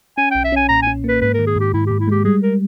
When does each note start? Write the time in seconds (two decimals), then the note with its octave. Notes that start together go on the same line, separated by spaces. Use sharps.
0.18 C#4 G#5
0.31 B1 G5
0.44 E5
0.52 C#4 G#5
0.69 A#2 A#5
0.82 G#5
0.87 C#4
1.04 A#3 B4
1.21 G#2 B4
1.34 A#4
1.39 D#3
1.47 G#4
1.56 G#2 G4
1.74 G#2 E4
1.87 G#2 G4
2.00 E4
2.07 G#3 G4
2.25 G3 G#4
2.43 A#4